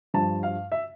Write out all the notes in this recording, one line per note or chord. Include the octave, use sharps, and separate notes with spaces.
G2 F3 A5
F5
E5